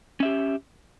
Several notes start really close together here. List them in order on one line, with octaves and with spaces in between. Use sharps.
C#4 E5 G4